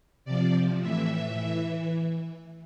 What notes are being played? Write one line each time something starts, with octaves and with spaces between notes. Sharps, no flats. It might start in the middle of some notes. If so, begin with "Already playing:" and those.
C3 F3 D5
A2 E3 E5
E3